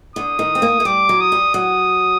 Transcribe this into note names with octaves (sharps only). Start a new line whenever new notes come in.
D3 D#6
D#3
C4
A#3
A3
G3 D6
F#3
D#6
G3
F#3 D#6